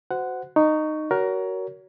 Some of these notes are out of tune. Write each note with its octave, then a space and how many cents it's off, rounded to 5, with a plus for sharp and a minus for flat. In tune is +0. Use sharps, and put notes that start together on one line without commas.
F#4 +0 C5 -25 F#5 +0
D#4 -15 C#6 +10
F#4 +20 A#4 +10 C#5 +25